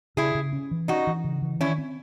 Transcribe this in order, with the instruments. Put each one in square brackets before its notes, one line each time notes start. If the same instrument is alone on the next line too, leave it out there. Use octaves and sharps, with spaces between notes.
[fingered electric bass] C#3 [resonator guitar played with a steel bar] E4 G#4
[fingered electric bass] C#3
C#4
E3
[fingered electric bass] C#4 [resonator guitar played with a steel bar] D#4 F#4
[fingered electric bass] E3
C#3
E3
[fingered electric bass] D#3 [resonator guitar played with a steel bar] C#4 E4
[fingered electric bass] C4